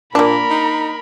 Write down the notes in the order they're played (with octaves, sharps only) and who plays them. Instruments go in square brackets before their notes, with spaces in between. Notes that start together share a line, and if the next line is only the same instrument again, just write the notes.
[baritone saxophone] A#2 [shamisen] A#3 D4 [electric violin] A#4 B5
[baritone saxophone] D#4